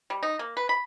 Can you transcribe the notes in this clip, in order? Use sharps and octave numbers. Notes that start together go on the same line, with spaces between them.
G3
D#4
A#3
B4
B5